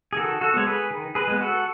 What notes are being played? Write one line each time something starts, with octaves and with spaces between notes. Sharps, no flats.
G#4
D#3 F#4 A4
F#4 A4
G#3 B3 C#5
G#4 B4
D#3
G#4 B4
G#3 B3
F#4 A4